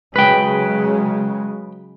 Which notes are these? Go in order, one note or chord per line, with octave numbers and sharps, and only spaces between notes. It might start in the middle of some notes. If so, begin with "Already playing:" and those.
C#3 F#3 G#3 B4 G5